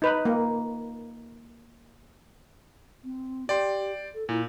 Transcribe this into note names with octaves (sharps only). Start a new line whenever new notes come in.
D#4 B4
A#3
C4
G4 D5 G5 C6
A4
A#2 E4